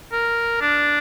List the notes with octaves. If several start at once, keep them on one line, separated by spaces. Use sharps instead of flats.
A#4
D4